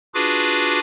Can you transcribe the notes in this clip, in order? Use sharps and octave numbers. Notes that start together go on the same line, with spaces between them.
D4 F4 F#4 G#4 B4 D6